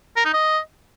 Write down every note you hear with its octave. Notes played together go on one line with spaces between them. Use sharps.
A#4
D#4
D#5